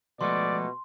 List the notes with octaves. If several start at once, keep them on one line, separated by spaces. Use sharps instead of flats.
B2 F3 G#3 A3 D5 C6